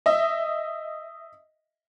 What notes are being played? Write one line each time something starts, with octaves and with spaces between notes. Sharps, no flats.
D#5 E5